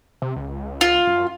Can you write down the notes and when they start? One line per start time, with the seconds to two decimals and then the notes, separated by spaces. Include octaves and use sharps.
0.22 C3
0.36 C#2
0.81 F4
1.07 F#2